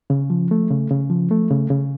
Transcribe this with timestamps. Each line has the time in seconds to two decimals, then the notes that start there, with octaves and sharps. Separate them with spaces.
0.10 C#3
0.30 F3
0.51 A3
0.71 C#3
0.91 C#3
1.10 F3
1.31 A3
1.50 C#3
1.70 C#3